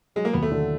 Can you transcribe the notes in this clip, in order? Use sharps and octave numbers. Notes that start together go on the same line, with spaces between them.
F#3 G#3
A#3
D#2 B3
A3
D3